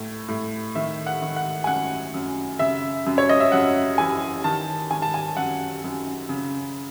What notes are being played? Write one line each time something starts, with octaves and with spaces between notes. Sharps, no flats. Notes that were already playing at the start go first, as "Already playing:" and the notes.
Already playing: A2
A2
D#3 E5
F#5
D#3
F#5
G#5
F#2 F#5
F#2
C#3 E5
F#2
C#5
D#5
E5
F#2 F#5
E3 G#5
D#3 A5
D#3 G#5
A5
G#5
F#2 F#5
F#2
C#3